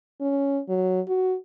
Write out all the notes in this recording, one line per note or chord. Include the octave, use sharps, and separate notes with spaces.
C#4
F#3
F#4